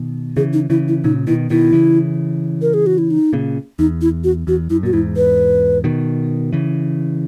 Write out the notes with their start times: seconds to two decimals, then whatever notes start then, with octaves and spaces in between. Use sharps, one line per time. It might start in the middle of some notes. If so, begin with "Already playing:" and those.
Already playing: B2 D#3
0.36 C#3 E3 G#4
0.53 D#4
0.70 C#3 E3 E4
0.88 E4
1.04 A#2 C#3 D#4
1.27 B2 D#3 E4
1.50 B2 D#3 E4
1.73 C#3 E3
2.62 A#4
2.74 G#4
2.86 F#4
2.98 E4
3.11 D#4
3.33 A#2 C#3
3.79 E2 D#4
4.02 E4
4.24 F#4
4.47 E2 F#4
4.70 F#2 E4
4.83 A#2 F#4
4.93 E2 G#2 E4
5.16 B4
5.84 B2 D#3
6.53 C#3 E3